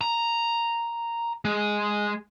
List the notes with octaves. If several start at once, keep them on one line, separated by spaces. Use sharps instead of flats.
A#5
G#3